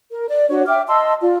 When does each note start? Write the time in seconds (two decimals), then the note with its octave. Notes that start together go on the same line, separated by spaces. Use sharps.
0.11 A#4
0.29 D5
0.49 D4 F#4 C#5
0.67 E5 G5 D6 F6
0.87 D#5 A5 C6 E6
1.20 F4 D5